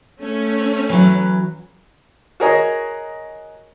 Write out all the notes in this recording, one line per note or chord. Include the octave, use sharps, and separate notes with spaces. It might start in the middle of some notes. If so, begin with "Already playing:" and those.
A3 C#4
E3 F#3
F#4 G#4 A#4 C#5 D#5